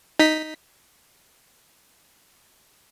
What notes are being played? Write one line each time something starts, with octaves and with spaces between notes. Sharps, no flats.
D#4 B6